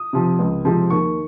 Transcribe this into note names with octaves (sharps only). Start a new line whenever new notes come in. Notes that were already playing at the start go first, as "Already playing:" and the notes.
Already playing: D#6
C3 F3 C4
C#2
C3 F3 G#3 C4
D#2 C#6